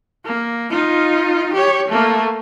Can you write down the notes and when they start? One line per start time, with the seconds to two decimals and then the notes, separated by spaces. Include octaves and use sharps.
0.25 A#3
0.71 D#4 F4
1.54 G4 C#5
1.88 A3 A#3